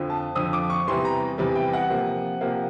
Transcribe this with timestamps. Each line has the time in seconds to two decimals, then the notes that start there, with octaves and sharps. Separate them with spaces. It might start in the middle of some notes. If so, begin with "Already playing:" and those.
Already playing: F2 D3 F3
0.10 A5
0.35 F2 D3 F3 D#6
0.53 D6
0.70 C#6
0.87 E2 C3 E3 G3 C6
1.05 A#5
1.38 E2 C3 E3 G3
1.56 G5
1.73 F#5
1.90 C3 F3 A#3
2.41 C3 F3 A#3